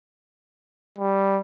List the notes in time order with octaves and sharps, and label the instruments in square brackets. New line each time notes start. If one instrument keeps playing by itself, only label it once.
[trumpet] G3